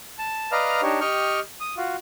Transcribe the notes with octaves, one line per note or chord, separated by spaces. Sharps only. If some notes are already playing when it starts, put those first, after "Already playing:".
A5
B4 D5 D#5 F5 A#5 F6
D4 D#4 G4 C#5
G4 D#5 G5 C#6 F6
D#6
F4 F#4